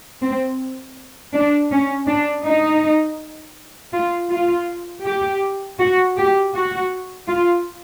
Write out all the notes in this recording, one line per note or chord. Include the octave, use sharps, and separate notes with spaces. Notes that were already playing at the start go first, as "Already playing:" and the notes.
C4
D4
C#4
D4
D#4
F4
F4
G4
F#4
G4
F#4
F4